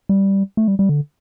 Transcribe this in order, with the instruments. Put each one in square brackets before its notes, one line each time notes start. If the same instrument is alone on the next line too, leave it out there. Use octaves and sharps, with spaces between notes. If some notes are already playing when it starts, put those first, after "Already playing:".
[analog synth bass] G3
A3
G3
G3
D3